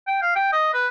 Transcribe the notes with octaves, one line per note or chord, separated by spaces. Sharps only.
G5
F5
G5
D#5
B4